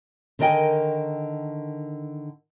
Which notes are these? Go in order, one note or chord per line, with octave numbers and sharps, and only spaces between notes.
D3 D#3 A#4 D#5 G5 G#5